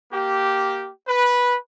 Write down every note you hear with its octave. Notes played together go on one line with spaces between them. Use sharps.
A#3 G4
B4